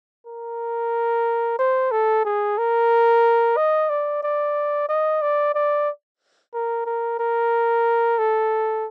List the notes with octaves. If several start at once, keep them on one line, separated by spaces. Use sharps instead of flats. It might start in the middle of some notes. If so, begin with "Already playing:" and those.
A#4
C5
A4
G#4
A#4
D#5
D5
D5
D#5
D5
D5
A#4
A#4
A#4
A4